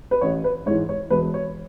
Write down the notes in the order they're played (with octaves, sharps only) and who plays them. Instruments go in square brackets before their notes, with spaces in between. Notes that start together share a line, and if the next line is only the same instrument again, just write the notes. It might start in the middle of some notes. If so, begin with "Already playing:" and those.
[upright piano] B4
A1 C#5
B4
G#2 C#5
E3
C#5
E1 B4
C#5